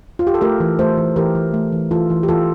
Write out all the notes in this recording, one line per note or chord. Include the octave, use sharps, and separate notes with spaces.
F4
G4
A4
A3 G4 A#4
E3
A3 A4 C5
E3
E3 G4 A#4
E3
A3
E3
E3 F4 A4
E3
G4
E3 F4 A4